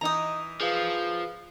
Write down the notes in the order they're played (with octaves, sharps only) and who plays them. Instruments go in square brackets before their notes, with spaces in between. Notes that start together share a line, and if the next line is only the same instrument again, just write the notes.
[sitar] E3 D#4 [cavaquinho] A#5 D#6
[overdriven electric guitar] F3 [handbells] G#4 B4 F5